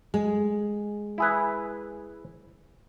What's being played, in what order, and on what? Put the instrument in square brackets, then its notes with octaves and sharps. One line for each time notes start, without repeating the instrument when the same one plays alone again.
[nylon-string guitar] G#3
[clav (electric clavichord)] E4 G#4 B4